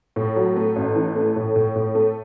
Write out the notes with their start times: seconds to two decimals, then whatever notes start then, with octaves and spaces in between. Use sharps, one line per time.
0.16 A2
0.36 F#3
0.56 A3
0.76 A1
0.95 E3
1.15 A3
1.36 A2
1.56 A2
1.76 A2
1.95 A3